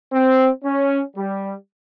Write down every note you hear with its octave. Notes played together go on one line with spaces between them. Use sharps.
C4
C#4
G3